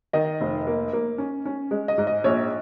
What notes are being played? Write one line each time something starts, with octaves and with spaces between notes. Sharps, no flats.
D#3 D#5
F1
A#3
A#3
C#4
C#4
G#3
D#5
G#2
D#5
A#1 C#5